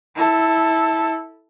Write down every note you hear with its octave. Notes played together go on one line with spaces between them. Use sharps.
E4 A4